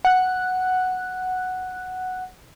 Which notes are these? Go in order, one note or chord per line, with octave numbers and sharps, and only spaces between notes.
F#5 F#6